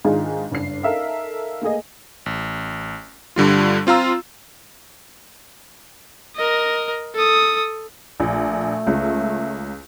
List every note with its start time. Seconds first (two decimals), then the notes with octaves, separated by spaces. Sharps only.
0.05 G#2 D#3 G#3 D4 F4
0.51 F#1 G2 D4 C7
0.83 D#4 A4 A#4 E5 F5
1.62 A3 A#3 G#4 D#5
2.26 A1
3.36 G2 D3 G3 F4
3.87 C4 F4 F5 A#5 E6
6.36 A#4 D#5
7.15 A4 D#6
8.20 A#1 A3
8.87 C#2